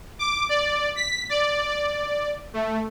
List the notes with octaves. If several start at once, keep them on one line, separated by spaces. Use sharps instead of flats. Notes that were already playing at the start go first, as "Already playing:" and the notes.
D6
D5
B6
D5
D5
A3